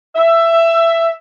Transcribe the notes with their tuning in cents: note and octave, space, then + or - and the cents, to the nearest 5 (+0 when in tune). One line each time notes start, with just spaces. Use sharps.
E5 +15